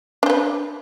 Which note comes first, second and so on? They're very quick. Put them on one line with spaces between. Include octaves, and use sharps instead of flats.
D4 C5 B4